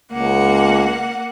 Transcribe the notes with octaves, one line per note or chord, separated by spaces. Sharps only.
C#2 A#3 F#5